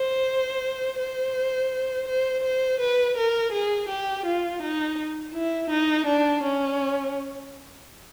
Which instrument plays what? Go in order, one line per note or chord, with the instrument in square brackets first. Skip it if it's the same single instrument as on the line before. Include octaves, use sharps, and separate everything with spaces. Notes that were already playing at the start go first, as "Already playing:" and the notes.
Already playing: [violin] C5
C5
C5
C5
B4
A#4
G#4
G4
F4
D#4
E4
D#4
D4
C#4